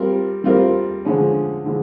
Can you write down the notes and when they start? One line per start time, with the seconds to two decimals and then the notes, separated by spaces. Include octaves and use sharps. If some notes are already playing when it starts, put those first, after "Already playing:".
Already playing: G3 C4 F4 A#4
0.44 G3 C4 F4 A#4
1.05 D3 F3 G#3 C#4
1.65 D3 F3 G#3